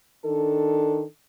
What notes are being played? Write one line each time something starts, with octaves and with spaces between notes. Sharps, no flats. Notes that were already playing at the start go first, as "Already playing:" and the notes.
D#3 D4 A4